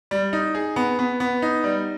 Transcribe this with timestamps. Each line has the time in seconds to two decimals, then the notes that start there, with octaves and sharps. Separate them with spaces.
0.11 G3
0.33 D#4
0.55 G#4
0.76 B3
0.99 B3
1.20 B3
1.42 D#4
1.64 G3